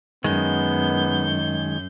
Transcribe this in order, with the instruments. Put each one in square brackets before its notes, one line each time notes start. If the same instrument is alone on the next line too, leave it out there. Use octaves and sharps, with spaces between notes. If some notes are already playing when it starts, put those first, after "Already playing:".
[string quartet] F#2 G6 [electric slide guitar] D#3 G#3 [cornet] B3